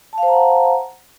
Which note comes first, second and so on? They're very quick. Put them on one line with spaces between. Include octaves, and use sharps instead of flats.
A5 F5 C5 A#5 F#5